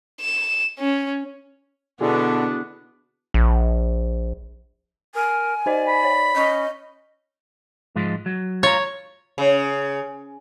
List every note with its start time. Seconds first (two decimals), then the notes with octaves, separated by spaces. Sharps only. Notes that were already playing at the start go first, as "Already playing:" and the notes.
0.21 E7
0.79 C#4
2.01 B2 D3 B3 D4 E4 F#4 G#4
3.34 A#1
5.15 A#4 G#5
5.66 D#4 C5 D5 D#5
5.88 B5
6.04 C#5
6.36 C#4 D#5
7.96 G#2 F3 G#3
8.26 F#3
8.63 F4 C#5 A#5
9.38 C#3